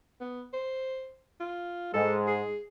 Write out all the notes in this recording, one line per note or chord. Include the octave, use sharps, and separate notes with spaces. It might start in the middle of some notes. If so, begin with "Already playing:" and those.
B3
C5
F4
G#2 G#3 A4
G#4